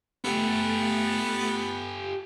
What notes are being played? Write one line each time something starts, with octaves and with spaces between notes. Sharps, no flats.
A3 B3 G4 A4 A6